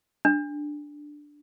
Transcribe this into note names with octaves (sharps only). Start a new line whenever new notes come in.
D4